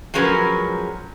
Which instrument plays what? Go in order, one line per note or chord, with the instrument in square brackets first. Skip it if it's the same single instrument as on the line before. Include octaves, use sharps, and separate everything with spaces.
[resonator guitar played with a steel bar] F3 F#3 G#3 C#4 A#4 B4